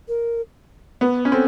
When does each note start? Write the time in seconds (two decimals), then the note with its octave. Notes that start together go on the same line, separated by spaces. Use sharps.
0.08 A#4
1.01 B3 B4
1.25 C#4
1.32 C4 A4